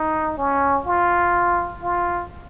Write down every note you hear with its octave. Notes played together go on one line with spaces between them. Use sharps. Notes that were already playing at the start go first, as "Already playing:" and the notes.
Already playing: D#4
C#4
F4
F4